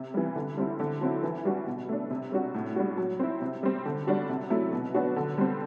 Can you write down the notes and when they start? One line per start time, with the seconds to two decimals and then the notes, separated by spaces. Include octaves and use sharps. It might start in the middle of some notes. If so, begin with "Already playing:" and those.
Already playing: C3
0.14 E3 G3
0.36 D3
0.57 G3 C4 E4
0.80 D3
1.01 F#3 C4 E4
1.23 E3
1.45 G3 D4 F#4
1.67 B2
1.89 A3 D4
2.10 C3
2.32 G3 D4 F#4
2.54 A2
2.76 G3 D4 F#4
2.97 F#3
3.19 C4 E4
3.42 C3
3.63 G3 C4
3.85 D3
4.07 G3 D4 F#4
4.29 C3
4.50 F#3 A3 E4
4.73 B2
4.94 F#3 B3 D4 F#4
5.16 D3
5.38 G3 C4